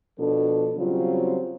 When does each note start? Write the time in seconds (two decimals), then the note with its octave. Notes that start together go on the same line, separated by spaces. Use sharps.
0.19 B2 F3 D4 A4
0.77 C#3 F#3 G3 C4 F4